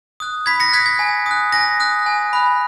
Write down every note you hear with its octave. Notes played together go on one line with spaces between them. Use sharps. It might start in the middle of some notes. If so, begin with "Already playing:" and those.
D#6 F#6
B5 G#6 B6
A#6 C#7
D#6 F#6 G#6 B6
G#6
G#5
D#6 F#6
G#5 A#6
D#6 F#6
G#5
B5 F#6